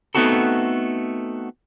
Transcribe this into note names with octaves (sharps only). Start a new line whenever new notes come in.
A3 B3 C4 D#4 F#4 A4